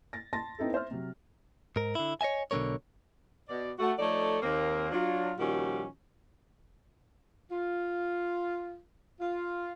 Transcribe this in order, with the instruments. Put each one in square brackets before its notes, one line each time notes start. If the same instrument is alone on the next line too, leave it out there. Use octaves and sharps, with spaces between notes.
[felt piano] A6 A#6
A5 C6 A6 A#6
B3 C4 D#4 E4 A4
C5 E5 F6
C3 F#3
[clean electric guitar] G#2 A#4
D3 E4
C#5 D#5 E5 G#5
B1 B2 D3 A3 A#4 C#5
[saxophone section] B2 D5
A3 F#4
F3 A3 D#4 A4 C#5 D5
D#2 A#3 C4
F#3 D4 F4
A#2 D#3 F3 G3 C#4 F#4
F4
F4